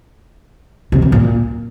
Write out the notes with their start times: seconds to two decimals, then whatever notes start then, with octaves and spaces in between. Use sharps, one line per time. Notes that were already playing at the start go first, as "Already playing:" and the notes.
0.92 C3
1.02 F#2
1.12 A#2